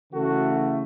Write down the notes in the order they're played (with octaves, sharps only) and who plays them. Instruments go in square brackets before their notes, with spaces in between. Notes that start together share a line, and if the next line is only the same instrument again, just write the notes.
[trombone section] C#3 E3 A3 F#4 A4